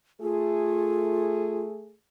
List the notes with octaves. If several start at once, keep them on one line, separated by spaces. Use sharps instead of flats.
A3 F4 G#4